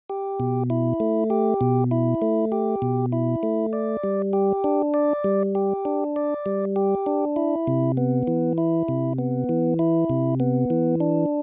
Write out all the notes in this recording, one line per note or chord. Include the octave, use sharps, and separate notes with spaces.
G4
B2
E4
A3
G4
B2
E4
A3
G4
B2
E4
A3
D5
G3
G4
D4
D5
G3
G4
D4
D5
G3
G4
D4
E4
C3
B3
E3
E4
C3
B3
E3
E4
C3
B3
E3
D4